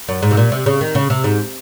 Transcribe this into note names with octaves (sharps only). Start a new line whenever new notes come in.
F#2
G#2
C3
A#2
C3
C#3
D#3
C#3
C3
G#2